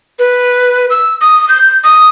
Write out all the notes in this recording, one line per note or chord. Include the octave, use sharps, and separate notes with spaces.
B4
E6
D#6
G6
D#6